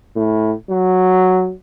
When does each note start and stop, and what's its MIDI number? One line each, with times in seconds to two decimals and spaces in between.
0.16 0.53 45
0.70 1.52 54